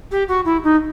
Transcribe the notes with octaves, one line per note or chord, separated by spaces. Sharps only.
G4
F#4
E4
D#4